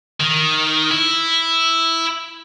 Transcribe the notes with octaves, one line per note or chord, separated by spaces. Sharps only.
D#3
E4